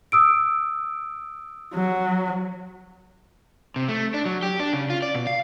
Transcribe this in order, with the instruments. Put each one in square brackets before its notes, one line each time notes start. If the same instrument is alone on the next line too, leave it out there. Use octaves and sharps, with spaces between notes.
[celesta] D#6 E6 D7
[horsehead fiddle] F#3
[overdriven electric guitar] C3
A3
D4
F#3
G4
D4
C#3
F4
D5
B2
F5